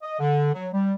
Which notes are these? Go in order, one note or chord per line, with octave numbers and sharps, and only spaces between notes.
D#5
D3
F#3
G3